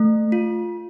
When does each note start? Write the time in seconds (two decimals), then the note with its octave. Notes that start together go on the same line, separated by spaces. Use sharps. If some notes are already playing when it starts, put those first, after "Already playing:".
Already playing: A3
0.32 F4